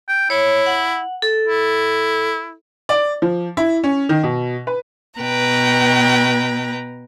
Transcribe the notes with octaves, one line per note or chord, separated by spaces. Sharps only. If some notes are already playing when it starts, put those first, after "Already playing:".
G5
E4 C#5
F#5
A4
E4
D5
F3
E4
C#4
D#3
B2
B4
B2 B4 G5 A#5